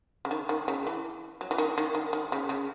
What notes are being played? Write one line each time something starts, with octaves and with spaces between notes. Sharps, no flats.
C#3
D#3
D#3
C#3
E3
F#3
E3
D#3
D#3
D#3
D#3
C#3
C#3